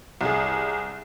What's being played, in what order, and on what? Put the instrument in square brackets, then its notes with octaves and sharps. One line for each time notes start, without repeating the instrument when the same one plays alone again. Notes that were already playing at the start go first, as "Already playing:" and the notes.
[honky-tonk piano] C2 G#4